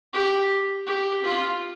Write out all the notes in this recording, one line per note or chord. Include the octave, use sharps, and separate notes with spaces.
G4
G4
F4